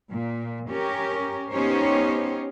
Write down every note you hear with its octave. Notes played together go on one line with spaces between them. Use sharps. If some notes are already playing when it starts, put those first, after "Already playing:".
A#2
C#4 G4 A#4
B3 C#4 D#4 G4 C5 C#5